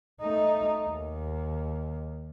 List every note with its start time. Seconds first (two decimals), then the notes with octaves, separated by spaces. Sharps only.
0.21 A3 D#4
0.88 D#2